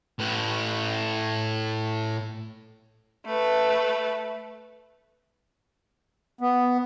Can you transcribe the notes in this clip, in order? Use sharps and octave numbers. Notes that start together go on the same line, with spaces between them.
A2 B4
A3 B4
B3